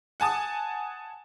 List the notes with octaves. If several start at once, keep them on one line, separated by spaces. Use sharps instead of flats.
F#5 G#5 A5 D#6